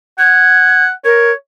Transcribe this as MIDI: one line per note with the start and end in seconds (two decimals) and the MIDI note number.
0.19 0.91 78
0.19 0.84 92
1.05 1.32 70
1.05 1.33 73